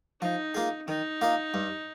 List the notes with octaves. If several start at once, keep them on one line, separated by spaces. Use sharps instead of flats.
F3 D#4
A#3 F4 G#4
D#3 D#4
A#3 F4 A#4 D#5
G2